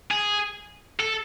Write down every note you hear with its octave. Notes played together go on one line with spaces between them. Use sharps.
G#4
A4